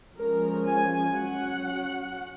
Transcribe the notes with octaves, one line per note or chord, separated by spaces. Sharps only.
F3 G#3 C#4 A#4
G#5
F#3 C#4 F#5